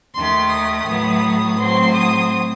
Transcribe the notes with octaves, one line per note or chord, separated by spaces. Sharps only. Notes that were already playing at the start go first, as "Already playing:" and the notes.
D#2 D#3 A3 C6
D#6
A2 F#3 B3
A2 F#3 C4 C6
D#6